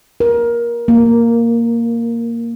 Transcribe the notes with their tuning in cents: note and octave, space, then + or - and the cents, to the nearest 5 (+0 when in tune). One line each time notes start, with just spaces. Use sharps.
A#4 +20
A#3 -5